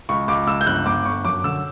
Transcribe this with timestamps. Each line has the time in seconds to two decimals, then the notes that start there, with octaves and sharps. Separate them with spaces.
0.09 C#2 C#6
0.28 C#2 D6
0.47 C#2 E6
0.61 G6
0.66 G1 F#6
0.86 G1 D6
1.05 G1 C#6
1.24 F#2 D6
1.44 D3 E6